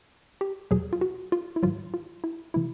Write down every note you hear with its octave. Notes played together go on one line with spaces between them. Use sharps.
G4
E2 B2 F#3 G#4
F4
F#4
F4
E4
G#2 D#3 F#3 F4
F4
E4
C3 E3 E4